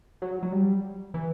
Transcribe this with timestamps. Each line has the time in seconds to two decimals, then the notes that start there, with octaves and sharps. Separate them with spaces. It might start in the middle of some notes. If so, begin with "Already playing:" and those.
0.22 F#3
0.43 F#3
0.52 G3
1.14 E3